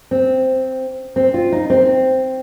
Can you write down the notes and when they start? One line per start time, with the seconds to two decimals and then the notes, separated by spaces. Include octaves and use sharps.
0.11 C4
1.16 C4
1.34 F4
1.52 D#4
1.70 C4